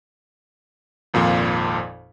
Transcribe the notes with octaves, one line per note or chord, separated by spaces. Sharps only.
G#1 F2 A#2 F3 F4